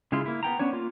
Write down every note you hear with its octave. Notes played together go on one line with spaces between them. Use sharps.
C#3 G#3 E4 F4
A#3 E4
B3 G5 A#5
B3 C#4 D4 C#5
A#3 F4